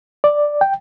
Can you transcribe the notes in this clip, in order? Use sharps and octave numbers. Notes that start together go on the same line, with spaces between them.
D5
G5